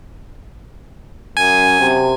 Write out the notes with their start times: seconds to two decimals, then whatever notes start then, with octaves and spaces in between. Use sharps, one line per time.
1.37 F#2 G#5
1.80 C3